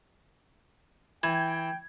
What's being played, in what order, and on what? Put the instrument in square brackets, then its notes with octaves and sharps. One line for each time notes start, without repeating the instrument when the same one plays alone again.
[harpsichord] E3 [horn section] G5 [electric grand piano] G#6